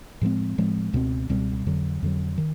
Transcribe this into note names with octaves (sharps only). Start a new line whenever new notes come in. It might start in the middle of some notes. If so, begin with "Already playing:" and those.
A2 F3 G#3 C4
A2 F3 G#3 C4
C#2 B2 G3 C4
C#2 B2 G3 C4
F2 D3 F#3
F2 D3 F#3
D#3